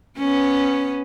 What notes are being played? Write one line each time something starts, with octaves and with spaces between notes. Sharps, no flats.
B3 C#4